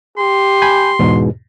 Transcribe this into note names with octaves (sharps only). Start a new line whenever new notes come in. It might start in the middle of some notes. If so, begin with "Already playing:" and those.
G4 C6
G#5 B5 G6
E2 G#2 B2